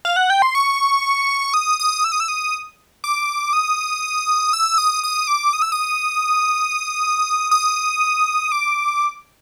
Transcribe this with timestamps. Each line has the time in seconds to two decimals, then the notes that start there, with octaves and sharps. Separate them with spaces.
0.05 F5
0.16 F#5
0.30 G5
0.42 C6
0.55 C#6
1.54 D#6
1.80 D#6
2.04 E6
2.12 D#6
2.20 E6
2.28 D#6
3.04 D6
3.53 D#6
4.53 E6
4.78 D#6
5.03 D#6
5.27 D6
5.53 D#6
5.62 E6
5.72 D#6
7.51 D#6
8.52 D6